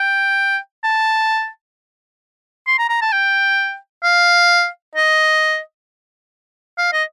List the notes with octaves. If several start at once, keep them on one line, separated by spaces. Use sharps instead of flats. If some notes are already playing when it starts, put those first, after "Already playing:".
Already playing: G5
A5
C6
A#5
A#5
A5
G5
F5
D#5
F5
D#5